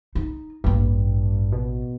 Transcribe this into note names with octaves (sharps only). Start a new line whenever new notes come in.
D#4
A1 G2 A#3
B2